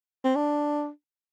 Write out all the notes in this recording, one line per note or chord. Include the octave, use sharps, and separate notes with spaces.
C4
D4